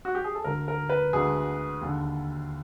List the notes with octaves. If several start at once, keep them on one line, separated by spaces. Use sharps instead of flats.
F#4
G4
G#4
A4
D2 D3 A#4
A#4
B4
D2 D3 G#4
D#2 D3